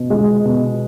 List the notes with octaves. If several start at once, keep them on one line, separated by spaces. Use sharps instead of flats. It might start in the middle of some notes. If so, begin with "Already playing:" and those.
Already playing: B2
G#3
B2